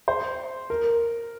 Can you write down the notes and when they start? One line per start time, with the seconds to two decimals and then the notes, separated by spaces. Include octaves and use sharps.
0.08 C5
0.70 A#4